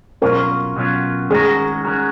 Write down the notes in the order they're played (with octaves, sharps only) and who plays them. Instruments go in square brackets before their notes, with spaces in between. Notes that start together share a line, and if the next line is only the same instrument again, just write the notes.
[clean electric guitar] B2 F#3 C#4 F4 [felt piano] A#4
[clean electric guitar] B2 F#3 C#4 F4
[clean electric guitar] D#3 G#3 C#4 F#4 A#4 [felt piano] G#4
[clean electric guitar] D#3 G#3 C#4 F#4 A#4